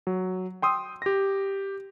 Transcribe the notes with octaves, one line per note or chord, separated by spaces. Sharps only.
F#3
G5 C6 D#6 E6
G4 A#6